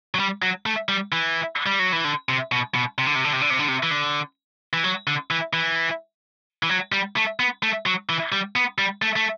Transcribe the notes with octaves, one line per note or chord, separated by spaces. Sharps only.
F#3
G3
F#3
A3
G3
E3
G3
F#3
E3
D3
C3
B2
B2
C3
D3
C3
D3
C3
D3
C3
D3
C3
E3
D3
E3
F#3
D3
E3
E3
E3
F#3
G3
A3
B3
A3
F#3
E3
G3
B3
G3
A3
A3